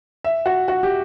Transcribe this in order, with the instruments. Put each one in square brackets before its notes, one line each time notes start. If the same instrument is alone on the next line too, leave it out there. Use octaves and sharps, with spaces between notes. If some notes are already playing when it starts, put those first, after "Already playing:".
[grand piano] E5
F#4
F#4
G4